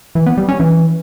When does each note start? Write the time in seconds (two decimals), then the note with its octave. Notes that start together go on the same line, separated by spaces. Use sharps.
0.15 E3
0.26 B3
0.37 G3
0.49 C#4
0.60 E3